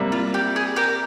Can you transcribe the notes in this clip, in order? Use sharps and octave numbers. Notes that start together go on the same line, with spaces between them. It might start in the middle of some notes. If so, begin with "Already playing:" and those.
Already playing: C3 G3 A#3
F4
G4
G#4
G4 A#4